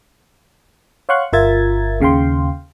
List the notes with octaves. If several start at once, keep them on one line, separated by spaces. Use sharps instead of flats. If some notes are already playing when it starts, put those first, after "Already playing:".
C#5 F5 F#5 C6 C#6 F#6
G1 F4 A#4 E5 G#6 A6
D#2 C#3 F5 G5 C6